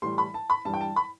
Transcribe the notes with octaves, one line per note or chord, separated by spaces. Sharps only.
A2 E3 G3 C6
B5
A5
B5
G2 E3 G3 A5
G5
A5
B5